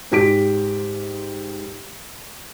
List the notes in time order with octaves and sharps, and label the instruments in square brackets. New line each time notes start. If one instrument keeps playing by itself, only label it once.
[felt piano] G#2 G4 B6 D7